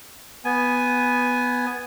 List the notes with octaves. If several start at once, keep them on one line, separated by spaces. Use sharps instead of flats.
B3 G#5